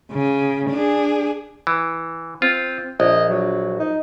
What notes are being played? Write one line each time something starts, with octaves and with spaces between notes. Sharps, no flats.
C#3
D4 G#4
E3
C4 F4
A#1 D#5
F#3
D#4